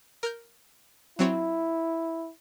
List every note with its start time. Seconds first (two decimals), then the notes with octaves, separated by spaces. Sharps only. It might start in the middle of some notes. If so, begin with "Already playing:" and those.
0.23 A#4 F6 G6
1.19 F#3 C4 E4 C#5